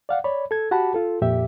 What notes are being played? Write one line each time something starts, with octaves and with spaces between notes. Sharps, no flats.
D5 F5 F#5
C#5 D5 B5
A4 G#6
F#4 G4 F#5 A5 B5
F4 A4
F2 A#2 G4 E5